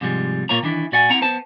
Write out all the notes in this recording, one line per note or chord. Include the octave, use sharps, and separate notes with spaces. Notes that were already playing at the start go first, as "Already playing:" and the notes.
G#2 C3 F3 G3 G#3
A#2 A#3 F4 C#5 A#5
D#3 E3 D4 E4
A#2 F#4 D5 F#5 G#5
C4 E4 F#5 A#5
B3 C5 A5